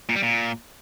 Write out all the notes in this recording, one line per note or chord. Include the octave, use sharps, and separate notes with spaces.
A#2
G3
A#2